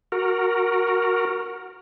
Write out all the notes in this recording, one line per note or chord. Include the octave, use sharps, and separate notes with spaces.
F#4 A#4